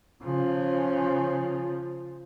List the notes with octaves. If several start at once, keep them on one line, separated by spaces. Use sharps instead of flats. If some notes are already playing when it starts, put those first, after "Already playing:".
C#3 F3